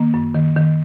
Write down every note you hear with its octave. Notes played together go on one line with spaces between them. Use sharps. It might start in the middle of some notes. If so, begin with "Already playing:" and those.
Already playing: D#3 A#3
F#2
D#3
D#3